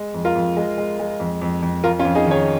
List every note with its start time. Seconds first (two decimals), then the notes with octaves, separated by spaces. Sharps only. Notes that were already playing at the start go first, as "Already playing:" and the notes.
Already playing: G#3
0.14 F2
0.25 F4 A#4
0.35 F2
0.57 G#3
0.78 G#3
0.99 G#3
1.20 F2
1.41 F2
1.62 F2
1.84 F2 F4 A#4
1.99 C#4 F4
2.05 F2
2.15 D#4 G#4
2.26 D#3 G#4 C#5